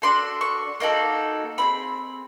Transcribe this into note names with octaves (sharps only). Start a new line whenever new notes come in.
D4 F#4 A4 C6
C#6
A#3 D#4 F#4 A4
C4 E4 G#4 B5